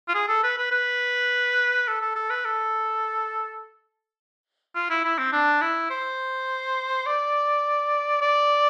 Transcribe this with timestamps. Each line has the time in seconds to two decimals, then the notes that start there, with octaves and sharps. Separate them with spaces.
0.08 F4
0.14 G#4
0.28 A4
0.43 B4
0.58 B4
0.71 B4
1.87 A4
2.01 A4
2.16 A4
2.30 B4
2.45 A4
4.75 F4
4.90 E4
5.05 E4
5.18 C4
5.33 D4
5.61 E4
5.90 C5
7.06 D5
8.21 D5